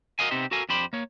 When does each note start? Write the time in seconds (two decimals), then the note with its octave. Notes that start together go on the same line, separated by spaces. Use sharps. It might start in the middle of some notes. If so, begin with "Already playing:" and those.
0.19 F#4 A#4 C5 D#5 F5 G#5
0.31 C3 B3 C4 D#4 G4 C5
0.51 F#4 A4 A#4 F5 G#5
0.69 F2 D4 G4 C5 B5
0.93 A#3 C#5